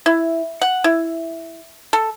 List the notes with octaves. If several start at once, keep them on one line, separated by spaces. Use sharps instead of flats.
E4
F#5
E4
A4